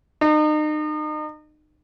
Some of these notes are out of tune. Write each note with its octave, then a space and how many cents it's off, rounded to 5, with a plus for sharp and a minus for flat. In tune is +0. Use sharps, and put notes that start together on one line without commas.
D#4 -35